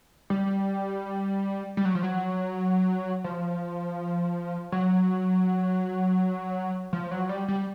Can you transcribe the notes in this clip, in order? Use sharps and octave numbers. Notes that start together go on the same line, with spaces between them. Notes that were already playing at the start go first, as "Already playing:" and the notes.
G3
G3
F#3
F3
F#3
F3
F#3
F3
F#3
G3
G3